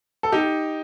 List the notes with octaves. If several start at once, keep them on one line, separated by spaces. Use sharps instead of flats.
A4
D#4 G4